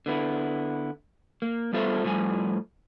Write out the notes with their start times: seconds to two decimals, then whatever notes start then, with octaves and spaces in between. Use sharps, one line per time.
0.06 D3 B3 E4
1.42 A#3
1.73 G3 B3 F4 A4 C5 E5
2.03 A2 F3 G3 G#5